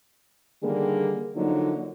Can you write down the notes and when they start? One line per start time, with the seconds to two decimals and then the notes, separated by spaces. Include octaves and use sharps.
0.63 D3 D#3 G3 A#3 G#4
1.35 D3 F3 F#3 A#3 D#4